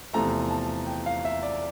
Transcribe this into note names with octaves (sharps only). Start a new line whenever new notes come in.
E2 C3 F3 A3 A#5
A5
G5
F5
E5
D5